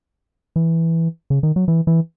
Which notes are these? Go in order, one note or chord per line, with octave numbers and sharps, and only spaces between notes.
E3
C#3
D#3
F#3
E3
E3